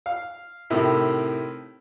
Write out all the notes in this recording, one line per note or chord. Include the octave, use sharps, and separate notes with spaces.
F5
A2 C3 D#3